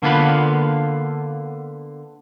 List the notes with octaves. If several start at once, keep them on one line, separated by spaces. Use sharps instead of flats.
D3 A#3 B3 F4 B4